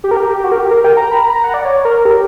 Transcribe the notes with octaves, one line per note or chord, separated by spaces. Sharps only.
G4
A#4
G4
G4
F#4
A#4
G4
A#4
G5
A#5
B5
A#5
A#5
F#5
D5
C#5
A#4
G4